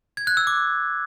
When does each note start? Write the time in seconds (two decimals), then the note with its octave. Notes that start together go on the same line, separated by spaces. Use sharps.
0.17 G#6
0.27 F#6
0.37 E6
0.47 D6